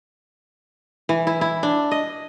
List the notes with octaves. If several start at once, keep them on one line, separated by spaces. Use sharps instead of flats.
E3
E4
E4
D4
D#5